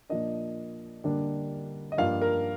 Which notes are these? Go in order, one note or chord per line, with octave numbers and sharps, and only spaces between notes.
A#2 F3 A#3 D4 D#5
D3 G3 A#3 D4
D#5
G2 F3 A#3 D4 F5
A#4